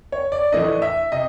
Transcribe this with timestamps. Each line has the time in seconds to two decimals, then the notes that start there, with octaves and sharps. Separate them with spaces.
0.12 C#5
0.32 D5
0.52 A2 E3 A3 D4 D#5
0.82 E5
1.12 C3 D#5